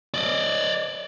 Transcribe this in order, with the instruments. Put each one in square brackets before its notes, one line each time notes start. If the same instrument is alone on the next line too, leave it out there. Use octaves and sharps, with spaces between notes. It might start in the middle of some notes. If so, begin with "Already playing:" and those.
[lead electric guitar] D5 D#5